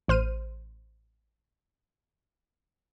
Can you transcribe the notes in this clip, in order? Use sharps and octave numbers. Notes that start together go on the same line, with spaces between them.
A1 C5 F6 D#7